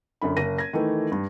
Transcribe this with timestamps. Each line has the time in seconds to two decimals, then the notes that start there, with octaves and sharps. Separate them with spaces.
0.22 F#2 D3 B5
0.37 F#1 A#6 D#7
0.58 G#6 A#6
0.73 D#3 E3 A3
1.12 G2